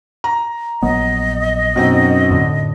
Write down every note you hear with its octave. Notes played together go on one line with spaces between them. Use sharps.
A#5
A#1 F#3 B3 D#5
F#2 B2 C4 D#4
F2 A2 D3